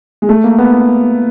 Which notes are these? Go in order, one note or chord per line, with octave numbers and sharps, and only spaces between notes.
G#3
A3
A#3
B3